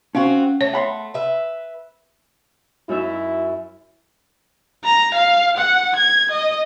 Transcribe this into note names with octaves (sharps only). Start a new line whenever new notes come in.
C4 C#4 F4 F#4
A3 C#5
F#5 B5 C6
B4 E5
F#2 D#4 E4 E5
A#5
F5
F#5
G#6
D#5